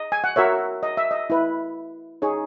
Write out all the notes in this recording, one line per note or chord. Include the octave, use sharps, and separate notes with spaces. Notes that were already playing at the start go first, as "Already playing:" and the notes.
Already playing: D#5
G#5
F#5
F#4 A#4 C#5 E5
D#5
E5
D#5
E4 B4
D#4 G#4 C#5